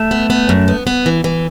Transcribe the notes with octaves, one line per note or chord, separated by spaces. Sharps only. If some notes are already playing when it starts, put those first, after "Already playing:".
Already playing: A3
B3
B3
F#2
B3
B3
E3
E3